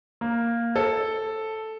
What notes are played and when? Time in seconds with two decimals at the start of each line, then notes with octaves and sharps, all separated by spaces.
0.21 A#3
0.76 A4